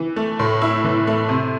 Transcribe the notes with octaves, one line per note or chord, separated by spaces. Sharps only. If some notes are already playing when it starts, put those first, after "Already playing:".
Already playing: E3
A3
A2
E4
E3
A3
C3